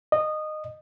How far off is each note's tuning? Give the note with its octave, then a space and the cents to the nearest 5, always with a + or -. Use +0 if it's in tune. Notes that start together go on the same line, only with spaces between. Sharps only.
D#5 -15